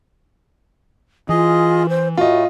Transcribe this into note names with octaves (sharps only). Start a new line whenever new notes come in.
E3 F4 G#4 D#5
C5
A2 A3 F4 F#4 D#5